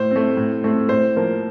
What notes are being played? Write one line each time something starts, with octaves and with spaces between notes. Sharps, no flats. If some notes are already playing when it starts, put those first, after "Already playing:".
Already playing: A2 C5
A3 C4
A2
A3 C4
A2 C5
F3 A#3